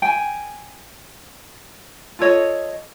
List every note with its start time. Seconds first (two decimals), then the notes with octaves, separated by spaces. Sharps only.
0.02 G5 G#5
2.19 F4 A4 C#5 D#5